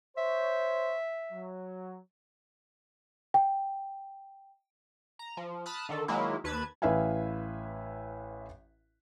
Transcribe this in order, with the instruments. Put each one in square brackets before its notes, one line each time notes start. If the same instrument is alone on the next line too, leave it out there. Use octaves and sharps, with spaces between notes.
[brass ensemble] C5 C#5 [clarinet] E5
[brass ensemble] F#3
[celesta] G5
[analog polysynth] A#5
F3
A5 B5 D#6 F6 F#6 A6
D3 D#3 A4
D#3 F#3 G#3 A#3 E4
D#2 B4 A5 G#6
[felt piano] A1 E4 B4 E5 F5 G#5